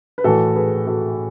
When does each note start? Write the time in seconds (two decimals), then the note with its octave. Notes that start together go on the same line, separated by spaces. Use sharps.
0.18 B4
0.24 A2 E3 A3 F#4 A4
0.56 G#4 B4
0.87 F#4 A4